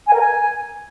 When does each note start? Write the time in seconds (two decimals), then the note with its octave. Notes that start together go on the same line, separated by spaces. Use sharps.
0.08 G#5
0.14 A#4
0.20 G#5